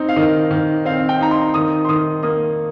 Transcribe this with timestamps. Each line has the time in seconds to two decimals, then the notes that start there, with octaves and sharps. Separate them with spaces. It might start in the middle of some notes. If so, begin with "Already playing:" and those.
Already playing: C4 D#4
0.09 F5
0.16 D#3 D#5
0.51 D#3
0.85 C4 F5
1.09 G5
1.21 D#4 A#5
1.31 C6
1.54 D#3 D#6
1.85 C6
1.89 D#3 D#6
2.23 A#3 D#6